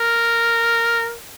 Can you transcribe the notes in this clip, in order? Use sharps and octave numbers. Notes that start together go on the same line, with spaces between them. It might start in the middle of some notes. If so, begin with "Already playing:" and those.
Already playing: A#4